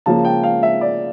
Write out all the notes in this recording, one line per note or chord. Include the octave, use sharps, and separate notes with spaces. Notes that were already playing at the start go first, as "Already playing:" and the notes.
C#3 F3 A#3 A5
G5
F5
E5
D5